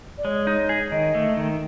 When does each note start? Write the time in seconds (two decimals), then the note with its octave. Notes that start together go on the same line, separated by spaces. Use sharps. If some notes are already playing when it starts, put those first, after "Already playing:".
0.18 D5
0.25 G#3 C#5
0.47 D#4
0.69 G#4
0.91 D#3 D#5
1.15 A3
1.37 D#3